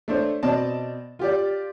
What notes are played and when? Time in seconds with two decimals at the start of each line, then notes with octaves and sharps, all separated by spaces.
0.08 A3 D4 C5 C#5
0.43 B2 C4 D5 D#5 A5
1.19 F4 G4 D5